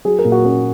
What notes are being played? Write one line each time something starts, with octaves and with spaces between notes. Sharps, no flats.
F#3 G#4
A#4
A#2
F#4
C#4 A#4